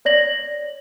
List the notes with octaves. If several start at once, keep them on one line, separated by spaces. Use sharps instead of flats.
C#5 D5 A#6 F#7